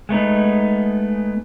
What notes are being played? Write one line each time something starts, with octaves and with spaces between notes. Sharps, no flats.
G#3 A3 B3 D#4